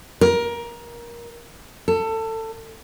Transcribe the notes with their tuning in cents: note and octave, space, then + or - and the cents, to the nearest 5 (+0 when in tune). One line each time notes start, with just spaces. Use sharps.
A#4 +20
A4 +25